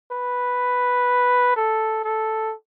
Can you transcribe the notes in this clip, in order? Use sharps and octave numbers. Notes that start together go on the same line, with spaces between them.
B4
A4
A4